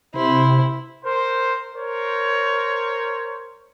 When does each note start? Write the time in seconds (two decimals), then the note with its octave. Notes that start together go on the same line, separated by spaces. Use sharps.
0.14 C3 E4 C5
1.04 A#4 C5
1.75 A#4 C5 C#5